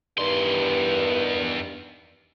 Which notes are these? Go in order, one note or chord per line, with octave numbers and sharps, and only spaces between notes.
E2 G2 D#3 C6